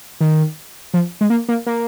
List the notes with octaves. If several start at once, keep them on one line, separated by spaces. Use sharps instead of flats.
D#3
F3
G#3
A#3
A#3
A#3